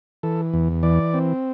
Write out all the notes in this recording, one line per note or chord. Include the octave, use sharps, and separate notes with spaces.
E3 A4
E2
E3 D5
C4